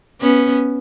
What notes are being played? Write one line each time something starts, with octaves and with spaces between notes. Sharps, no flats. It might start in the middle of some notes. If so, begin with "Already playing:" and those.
B3 C#4